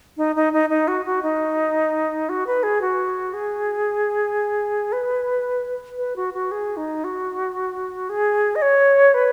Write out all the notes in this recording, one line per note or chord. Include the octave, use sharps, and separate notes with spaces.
D#4
D#4
D#4
D#4
F#4
F#4
D#4
F#4
B4
G#4
F#4
G#4
B4
B4
F#4
F#4
G#4
D#4
F#4
G#4
D#5
C#5
B4